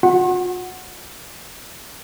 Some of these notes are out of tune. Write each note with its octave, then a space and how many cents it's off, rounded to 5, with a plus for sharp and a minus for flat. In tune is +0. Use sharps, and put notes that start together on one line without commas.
F4 +45 F#5 +0